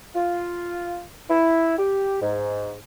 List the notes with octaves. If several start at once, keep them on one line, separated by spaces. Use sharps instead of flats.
F4
E4
G4
G#2